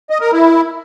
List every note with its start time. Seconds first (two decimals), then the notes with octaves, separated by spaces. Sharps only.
0.10 D#5
0.21 A#4
0.32 E4